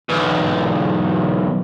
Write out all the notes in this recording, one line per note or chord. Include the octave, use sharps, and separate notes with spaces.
B1 E2